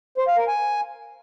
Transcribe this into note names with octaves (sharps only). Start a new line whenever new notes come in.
C5
F5
A#4
G#5